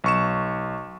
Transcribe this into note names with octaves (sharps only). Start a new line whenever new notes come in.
B1 C#6 E7